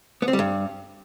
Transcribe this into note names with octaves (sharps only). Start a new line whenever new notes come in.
B3
C4
G3
G2